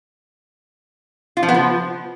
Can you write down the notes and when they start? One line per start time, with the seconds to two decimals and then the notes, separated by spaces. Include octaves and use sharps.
1.37 F4
1.43 F3
1.49 B3
1.54 F3